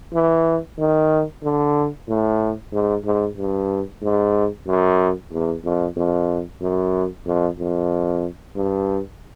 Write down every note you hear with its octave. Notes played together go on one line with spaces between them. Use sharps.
E3
D#3
D3
A2
G#2
G#2
G2
G#2
F#2
E2
F2
F2
F#2
F2
F2
G2